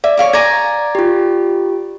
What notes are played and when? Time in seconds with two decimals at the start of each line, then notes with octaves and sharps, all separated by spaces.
0.04 D5 E5
0.17 C#5 F5 D6
0.33 D5 G#5 A#5 G#6
0.95 F4 G4